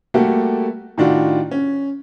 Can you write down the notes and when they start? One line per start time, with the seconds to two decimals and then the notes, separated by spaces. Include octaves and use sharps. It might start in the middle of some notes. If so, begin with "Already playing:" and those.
0.14 G3 A3 A#3 F#4 G4 A4
0.98 A2 D#3 D4 F4 F#4
1.51 C#4